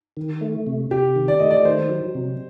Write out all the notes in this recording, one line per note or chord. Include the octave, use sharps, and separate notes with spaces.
D#3
A3
C3
C3 G4
D#3
D5
A3 D#5
D5
D#3 C5
F#3
C3